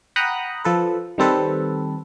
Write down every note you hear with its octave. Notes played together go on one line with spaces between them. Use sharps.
F#5 G5 A#5 B5 D#6 F#6
F3 A4 B4
D#3 G3 C4 A4 B4